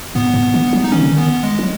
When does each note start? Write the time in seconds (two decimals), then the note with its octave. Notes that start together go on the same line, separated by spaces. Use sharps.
0.15 G#2 B3
0.34 G#2
0.54 D#3
0.73 F#3
0.84 D#4
0.92 D#3 C#4
1.02 C#3
1.11 D#3
1.18 B3
1.43 G#3
1.59 F#3